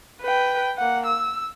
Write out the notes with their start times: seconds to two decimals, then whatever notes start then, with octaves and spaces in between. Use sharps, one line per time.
0.21 B4 G5
0.78 A#3 F#5
1.06 E6